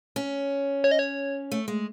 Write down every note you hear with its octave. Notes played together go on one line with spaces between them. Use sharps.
C#4
C#5
D#5
C#5
A3
G#3